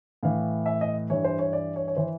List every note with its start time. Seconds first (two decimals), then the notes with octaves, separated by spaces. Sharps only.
0.23 A2 E3 F5
0.66 E5
0.81 D#5
1.10 G2 E3 C#5
1.24 C5
1.39 C#5
1.53 D5
1.76 C#5
1.88 C#5
1.96 E3 C5